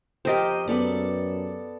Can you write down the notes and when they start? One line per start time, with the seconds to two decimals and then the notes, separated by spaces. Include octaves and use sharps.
0.25 F2 G4 A#4 C5 D#5
0.68 F#2 B3 A4 D5